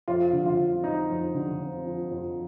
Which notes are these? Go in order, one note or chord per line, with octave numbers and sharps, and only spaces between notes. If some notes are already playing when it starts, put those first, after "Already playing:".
F2 F4
D3
F4
C4
F3 D#4
F2
D3
C4
F3
F2